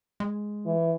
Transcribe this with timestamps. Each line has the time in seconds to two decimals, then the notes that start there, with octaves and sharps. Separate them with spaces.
0.20 G#3
0.66 E3